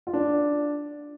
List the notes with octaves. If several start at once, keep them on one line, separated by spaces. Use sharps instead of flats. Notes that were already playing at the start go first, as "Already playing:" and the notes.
F4
D4